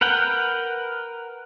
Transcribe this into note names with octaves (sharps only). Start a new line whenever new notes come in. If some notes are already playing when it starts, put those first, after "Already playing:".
A#4 B4 F#5 G5